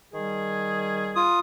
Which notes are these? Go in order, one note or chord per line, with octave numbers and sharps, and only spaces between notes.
D#3 G3 G#4
F4 D#6